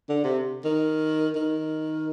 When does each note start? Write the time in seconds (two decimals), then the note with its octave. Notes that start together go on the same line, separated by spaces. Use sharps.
0.09 D3
0.24 C3
0.65 D#3
1.35 D#3